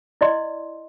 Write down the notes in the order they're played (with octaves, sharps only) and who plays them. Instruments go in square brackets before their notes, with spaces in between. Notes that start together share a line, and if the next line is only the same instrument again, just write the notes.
[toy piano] E4 D5 D#5 C6